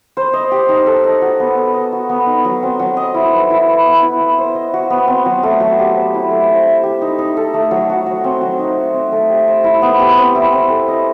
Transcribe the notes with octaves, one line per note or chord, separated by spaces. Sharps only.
C5
D#5
G4
D#4
A4
D#5
F#4
B3
A4
D#5
F#4
B3
D#4
F#3
C4
F#3
D#5
E4
B4
E4
B4
B3
E4
B3
C5
D#5
F#4
B3
C4
F#3
A3
F#3
G4
C5
E4
A3
C5
E5
G4
D#4
D#4
A4
A3
F#3
F#4
F#3
C4
F#3
D#4
F#4
C4
A3
G4
C5
E4
B3
G4
C4
E4
C4
A4
D#5